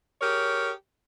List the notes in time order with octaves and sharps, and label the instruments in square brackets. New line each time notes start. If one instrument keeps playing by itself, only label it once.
[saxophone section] G4 G#4 A#4 C#5